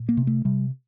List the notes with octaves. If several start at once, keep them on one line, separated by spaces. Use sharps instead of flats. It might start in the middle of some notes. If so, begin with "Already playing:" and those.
Already playing: A#2
A#3
C3
A3
C3 G3